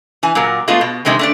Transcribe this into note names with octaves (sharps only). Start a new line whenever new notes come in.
E3 G#5
A#2 F#3 A#4
G#3 A3 B3 F4
B2
C3 D#3 G#3 A3 C4
A3 D4 D5